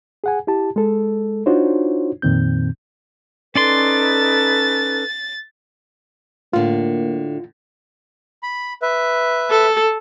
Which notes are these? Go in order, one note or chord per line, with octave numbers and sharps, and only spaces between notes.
G#4 F#5 G#5
E4 G4 A5
G#3 A4
D4 D#4 F4 F#4 C5 C#5
F2 A#2 D#3 C4 G6
C#4 D#4 A4 B4 D5 C6 A6
A2 D3 A#3 F4
B5
B4 E5
A4